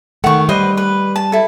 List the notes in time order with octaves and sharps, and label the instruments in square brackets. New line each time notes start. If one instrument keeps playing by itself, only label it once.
[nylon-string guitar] D#3 A3 [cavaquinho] F#5 C#6
[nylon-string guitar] G3 [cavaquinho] B4 C5 D#5
[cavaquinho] B4
A5
E4 A4